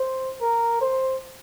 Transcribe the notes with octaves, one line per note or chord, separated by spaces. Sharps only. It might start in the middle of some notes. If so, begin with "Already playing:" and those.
Already playing: C5
A#4
C5